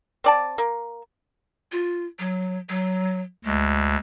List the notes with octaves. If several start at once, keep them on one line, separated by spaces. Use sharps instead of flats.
C4 D5 A5
A#3
F4
F#3
F#3
D2 G#3